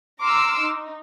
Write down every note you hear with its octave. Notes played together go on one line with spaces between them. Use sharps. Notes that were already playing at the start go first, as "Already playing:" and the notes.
A#5 C6 D6 E6 F6
D#4